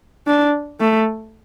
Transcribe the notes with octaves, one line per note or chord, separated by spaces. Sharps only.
D4
A3